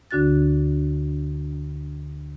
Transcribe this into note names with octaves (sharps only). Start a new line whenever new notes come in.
D2 D3 D4 F#4 F#6 A6